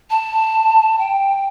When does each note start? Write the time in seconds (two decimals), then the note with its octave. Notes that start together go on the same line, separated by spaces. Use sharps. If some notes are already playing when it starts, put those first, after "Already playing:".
0.10 A5
0.98 G5